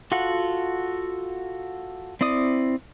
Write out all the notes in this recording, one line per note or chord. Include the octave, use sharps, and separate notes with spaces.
F4 F#4 A4 F#5
C4 E4 D5 D#6